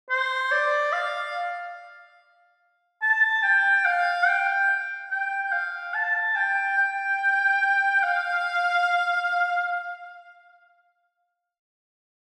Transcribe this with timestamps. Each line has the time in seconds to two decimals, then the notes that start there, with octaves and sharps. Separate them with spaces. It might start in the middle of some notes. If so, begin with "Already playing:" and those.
0.10 C5
0.51 D5
0.93 F5
3.02 A5
3.43 G5
3.85 F5
4.27 G5
5.11 G5
5.52 F5
5.94 A5
6.36 G5
6.78 G5
8.03 F5